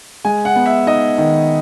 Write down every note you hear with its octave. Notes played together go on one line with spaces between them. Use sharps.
G#3 G#5
F#5
B3
E5
D#4 D#5
D#3